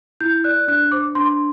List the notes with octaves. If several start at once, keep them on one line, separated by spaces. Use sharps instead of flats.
E4 G6
D5 F#6
D4 F#6
C5 D6
D4 C6